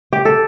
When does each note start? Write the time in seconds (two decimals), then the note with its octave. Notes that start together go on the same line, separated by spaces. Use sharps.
0.13 G4
0.25 A4